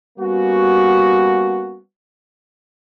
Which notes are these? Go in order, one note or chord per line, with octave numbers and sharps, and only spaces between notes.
G3 A#3 B3 C#4 F#4